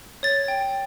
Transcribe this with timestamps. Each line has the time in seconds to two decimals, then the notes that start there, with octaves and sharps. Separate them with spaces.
0.23 C#5 A6
0.48 G5